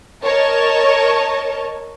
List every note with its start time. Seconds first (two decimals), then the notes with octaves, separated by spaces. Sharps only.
0.24 A#4 C#5 D#5 A5